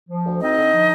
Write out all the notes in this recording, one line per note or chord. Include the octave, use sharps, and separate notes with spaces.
F3
D2
C4 D#4 D#5
D3
F3